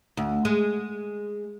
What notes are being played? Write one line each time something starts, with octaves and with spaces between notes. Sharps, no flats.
D2
G#3